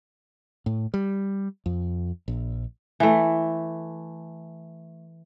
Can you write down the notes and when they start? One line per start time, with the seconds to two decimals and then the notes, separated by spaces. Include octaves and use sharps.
0.66 A2
0.94 G3
1.66 F2
2.28 A#1
3.00 E3 A3